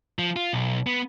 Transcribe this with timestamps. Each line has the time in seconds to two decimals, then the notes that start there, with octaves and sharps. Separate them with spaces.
0.19 F3
0.36 F4
0.53 B1
0.87 B3